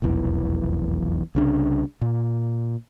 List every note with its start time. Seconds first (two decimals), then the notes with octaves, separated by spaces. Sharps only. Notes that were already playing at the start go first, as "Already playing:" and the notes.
0.02 F1 B1 E2 E3
1.35 C2 C#3 D4
2.02 A#2